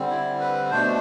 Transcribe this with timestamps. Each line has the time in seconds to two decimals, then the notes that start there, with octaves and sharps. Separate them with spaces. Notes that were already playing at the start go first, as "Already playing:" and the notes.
Already playing: D3 G3 C4
0.10 E4
0.40 B4
0.71 B2 A3 D4 C5